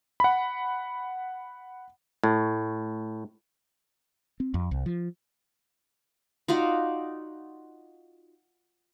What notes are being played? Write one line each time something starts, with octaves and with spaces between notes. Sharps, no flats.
F#5 B5
A2
C4
F2
C2
F3
D#4 F4 F#4 D5